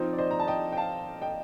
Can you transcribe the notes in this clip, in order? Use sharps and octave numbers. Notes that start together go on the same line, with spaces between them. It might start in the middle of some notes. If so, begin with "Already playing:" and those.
Already playing: F3 C4 D#4 C5
D5
C5 D#5
A#5
A5
D#5 G5
G5
F5 A5
D#5 G5